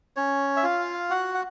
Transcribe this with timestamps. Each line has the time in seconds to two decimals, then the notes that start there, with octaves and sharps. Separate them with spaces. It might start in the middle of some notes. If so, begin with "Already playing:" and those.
0.16 C#4 C#5
0.56 E5
0.63 F4 F5
1.10 F#4 F#5
1.35 F#5